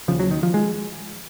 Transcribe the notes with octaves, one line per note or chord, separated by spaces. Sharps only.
D#2 C#3 F3
F#3
D#3
F3
G#3